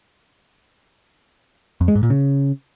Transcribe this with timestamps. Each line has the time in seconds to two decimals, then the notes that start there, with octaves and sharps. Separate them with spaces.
1.81 F2
1.88 G#3
1.95 G#2
2.03 A#2
2.10 C#3